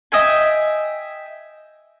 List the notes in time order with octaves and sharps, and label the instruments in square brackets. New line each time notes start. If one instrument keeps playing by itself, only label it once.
[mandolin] D#5 E5 G5 G#5